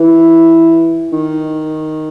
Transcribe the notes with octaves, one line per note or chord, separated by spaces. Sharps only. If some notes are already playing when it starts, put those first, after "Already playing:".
Already playing: E3
D#3